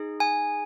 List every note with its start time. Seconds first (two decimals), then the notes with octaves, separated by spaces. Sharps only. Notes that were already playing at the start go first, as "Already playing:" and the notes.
Already playing: D#4 G#4
0.20 G#5